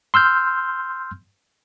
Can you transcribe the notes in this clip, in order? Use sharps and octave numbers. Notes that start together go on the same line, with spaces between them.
C6 E6 F6 G6